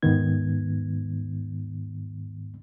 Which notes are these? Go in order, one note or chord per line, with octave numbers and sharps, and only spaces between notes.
D#2 G#2 D#3 B3 G#6